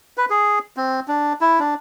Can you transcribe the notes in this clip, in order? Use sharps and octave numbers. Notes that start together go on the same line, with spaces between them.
B4
G#4
C4
D4
E4
D4